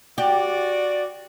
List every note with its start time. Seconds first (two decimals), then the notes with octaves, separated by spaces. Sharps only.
0.18 F#4 G4 D5